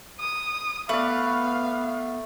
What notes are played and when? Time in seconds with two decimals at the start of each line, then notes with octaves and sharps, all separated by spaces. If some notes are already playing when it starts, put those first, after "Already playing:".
0.20 D#6
0.89 A3 B3 B4 D5 F5